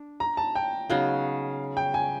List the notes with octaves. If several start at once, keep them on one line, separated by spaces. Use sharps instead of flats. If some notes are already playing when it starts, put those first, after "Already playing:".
Already playing: D4
A#5
A5
G5
C#3 F#3 B3 D#4 F5
G5
G#5